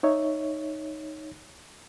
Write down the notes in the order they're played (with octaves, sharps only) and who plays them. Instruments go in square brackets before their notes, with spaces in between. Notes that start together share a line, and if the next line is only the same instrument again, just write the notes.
[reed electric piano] D#4 C#5 E5